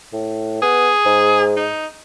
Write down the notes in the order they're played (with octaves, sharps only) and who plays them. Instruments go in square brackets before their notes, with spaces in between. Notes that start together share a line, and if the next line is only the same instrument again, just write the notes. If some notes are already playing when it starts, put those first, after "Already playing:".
[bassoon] A2
[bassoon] B3 [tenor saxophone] G#4
[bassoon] G#2
[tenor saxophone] D#4